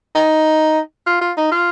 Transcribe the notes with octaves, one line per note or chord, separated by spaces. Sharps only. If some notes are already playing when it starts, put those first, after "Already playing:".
D#4
F4
F4
D#4
F4